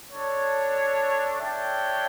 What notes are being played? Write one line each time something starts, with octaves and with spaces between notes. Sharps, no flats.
D4 A4 C#5
D4 A4 C#5 E5 G5